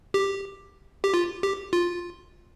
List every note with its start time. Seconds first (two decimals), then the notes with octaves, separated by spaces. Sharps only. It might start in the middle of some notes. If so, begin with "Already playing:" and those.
0.14 G4
1.04 G4
1.14 F4
1.43 G4
1.73 F4